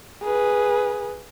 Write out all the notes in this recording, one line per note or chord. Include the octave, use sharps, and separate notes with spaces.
G#4 B4